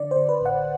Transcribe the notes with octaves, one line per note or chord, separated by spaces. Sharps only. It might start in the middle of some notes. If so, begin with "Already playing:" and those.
Already playing: D3 D5
C5
D3
B4
A1
F#5